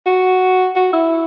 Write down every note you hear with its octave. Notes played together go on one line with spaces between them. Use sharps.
F#4
F#4
E4